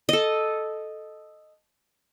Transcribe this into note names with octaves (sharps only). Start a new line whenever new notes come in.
A4 D#5